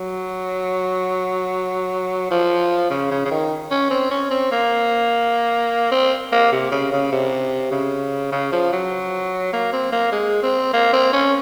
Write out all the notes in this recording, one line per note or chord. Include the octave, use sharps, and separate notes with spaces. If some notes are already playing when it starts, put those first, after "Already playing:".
Already playing: F#3
F3
C#3
C#3
C#3
D#3
C#4
C4
C#4
C4
A#3
C4
A#3
C3
C#3
C#3
C3
C#3
C#3
F3
F#3
A#3
C4
A#3
G#3
C4
A#3
C4
C#4